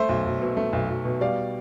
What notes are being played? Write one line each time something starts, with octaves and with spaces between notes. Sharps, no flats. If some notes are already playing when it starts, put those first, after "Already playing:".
Already playing: A3 C5 E5
B1
B1
B2
A3
B1
B1
B2
G3 D5 F5